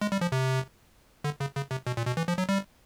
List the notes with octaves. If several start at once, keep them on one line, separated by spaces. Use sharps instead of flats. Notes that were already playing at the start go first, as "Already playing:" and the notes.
G#3
G3
F3
C3
D3
C#3
C#3
C3
B2
A#2
B2
E3
F3
F#3
G3